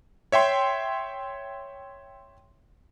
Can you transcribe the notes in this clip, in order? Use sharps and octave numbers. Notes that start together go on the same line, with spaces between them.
C#5 E5 G5 C6